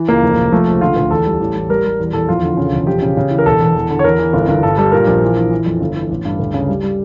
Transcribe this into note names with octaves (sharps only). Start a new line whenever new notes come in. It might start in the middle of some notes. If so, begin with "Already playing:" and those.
Already playing: E3
C#2 A#3
F1
F1
F3 A3
C#2
D3 F4
D2
E2 A4
G3
A1
A1
G3 A#4
G3
E2
E2 A4
F2 F4
D3
C#3
E1
F3 G4
C#3
C#3
E3
A#4
E1 A4
E2
E2
D3
C#5
E2 A#4
E3
G1
G1
G2 A4
G3 A4
A#2 A#4
A#1
E3
E3
E3
F2
G1
E3
A1
G2
D2
C#3
G3
G3